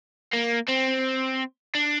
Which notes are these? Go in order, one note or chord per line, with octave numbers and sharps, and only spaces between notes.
A#3
C4
D4